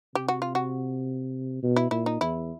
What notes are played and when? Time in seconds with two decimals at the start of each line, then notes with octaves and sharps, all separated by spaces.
0.15 C3 G4
0.28 F#4
0.42 F4
0.55 F#4
1.63 B2
1.76 E4
1.91 A#2 E4
2.06 D#4
2.21 E2 E4